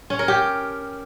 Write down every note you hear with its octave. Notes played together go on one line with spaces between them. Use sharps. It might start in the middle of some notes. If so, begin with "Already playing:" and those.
C#4
A#4
G4